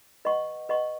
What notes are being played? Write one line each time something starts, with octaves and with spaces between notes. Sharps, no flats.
B4 D#5 F#5 C#6
B4 D#5 F#5 C#6